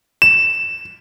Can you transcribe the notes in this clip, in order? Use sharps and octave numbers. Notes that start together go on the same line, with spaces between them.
E7